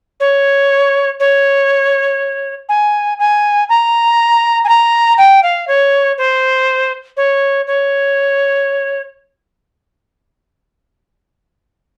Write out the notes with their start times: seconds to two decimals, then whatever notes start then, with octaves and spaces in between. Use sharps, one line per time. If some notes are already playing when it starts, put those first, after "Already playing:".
0.20 C#5
1.20 C#5
2.69 G#5
3.19 G#5
3.69 A#5
4.64 G#5
4.69 A#5
5.18 G5
5.43 F5
5.68 C#5
6.18 C5
7.17 C#5
7.67 C#5